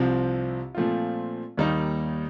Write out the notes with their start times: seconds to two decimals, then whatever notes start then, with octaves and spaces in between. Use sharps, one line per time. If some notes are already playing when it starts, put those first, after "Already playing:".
Already playing: C2 C3 F3 C4
0.75 A#2 F3 A3 C4 F4
1.57 D#2 D#3 G3 A#3 D#4